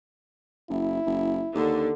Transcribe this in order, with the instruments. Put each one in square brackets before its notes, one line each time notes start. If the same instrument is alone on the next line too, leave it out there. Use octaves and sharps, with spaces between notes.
[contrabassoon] F#1 [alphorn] E4
[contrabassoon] F#1
[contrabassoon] D#2 [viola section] D3